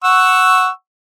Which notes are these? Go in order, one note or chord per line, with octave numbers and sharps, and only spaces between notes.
F#5 C#6 E6